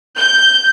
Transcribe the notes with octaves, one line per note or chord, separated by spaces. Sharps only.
G6